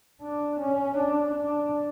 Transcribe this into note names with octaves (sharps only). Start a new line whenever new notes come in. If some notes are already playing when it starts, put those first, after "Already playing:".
D4
C#4
D4
D4